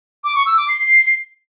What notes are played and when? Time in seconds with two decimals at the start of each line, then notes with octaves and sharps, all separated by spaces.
0.24 D6
0.35 C#6
0.46 E6
0.57 D6
0.68 C7